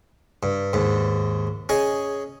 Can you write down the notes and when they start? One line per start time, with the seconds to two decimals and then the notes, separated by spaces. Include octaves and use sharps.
0.43 G2
0.73 D#2 G#2
1.69 C#4 G#4 D#5